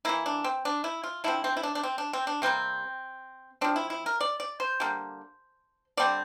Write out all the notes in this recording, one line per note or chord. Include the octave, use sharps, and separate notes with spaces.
E3 A#3 E4
D4
C4
D4
E4
F4
D3 F3 C4 E4
C4
E4
D4
D4
C4
D4
C4
D4
C3 G3 A#3 C4
F3 C4 D4
E4
E4
A#4
D5
D5
C5
D3 G3 A#3
D3 G3 C4 D5